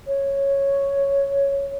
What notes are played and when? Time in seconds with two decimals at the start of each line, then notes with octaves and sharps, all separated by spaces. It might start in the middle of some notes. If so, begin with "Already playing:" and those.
0.07 C#5